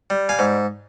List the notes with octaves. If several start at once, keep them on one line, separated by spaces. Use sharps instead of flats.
G3
F5 G#5
G#2